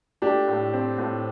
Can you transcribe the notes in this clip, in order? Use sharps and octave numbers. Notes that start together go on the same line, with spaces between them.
A3 D4 G4
A2
C4
A2